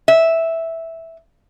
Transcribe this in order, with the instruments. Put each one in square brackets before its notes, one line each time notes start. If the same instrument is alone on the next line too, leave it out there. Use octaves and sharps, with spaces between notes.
[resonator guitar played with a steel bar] E5